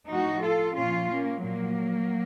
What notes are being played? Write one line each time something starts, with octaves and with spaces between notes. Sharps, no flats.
A2 F3 D#4 F#4
F4 A4
A#2 F3 C#4 F4
A#3 C#4
A#2 F3 F#3 A#3